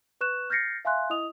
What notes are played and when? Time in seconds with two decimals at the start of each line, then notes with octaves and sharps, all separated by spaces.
0.21 B4 C#6 F#6 E7
0.50 F6 G6 A6 A#6 C7 C#7
0.85 E5 F5 G#5 C6 F#6
1.10 E4 D#5 D#6 F7